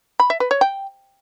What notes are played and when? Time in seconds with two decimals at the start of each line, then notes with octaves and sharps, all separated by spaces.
0.20 B5
0.30 E5
0.40 B4
0.51 C#5
0.61 G5